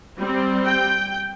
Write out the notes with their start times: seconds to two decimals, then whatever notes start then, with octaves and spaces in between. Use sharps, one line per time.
0.19 G3 C4
0.64 G5